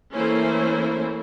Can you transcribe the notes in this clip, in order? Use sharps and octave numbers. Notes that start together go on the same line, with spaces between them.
E3 A3 A#3 C#4 E4 C5